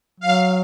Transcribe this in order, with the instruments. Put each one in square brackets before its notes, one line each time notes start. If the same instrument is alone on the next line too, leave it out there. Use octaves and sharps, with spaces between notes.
[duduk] F#3 [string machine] F5